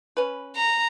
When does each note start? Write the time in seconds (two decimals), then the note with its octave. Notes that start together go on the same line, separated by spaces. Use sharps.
0.17 C#4 B4
0.56 A#5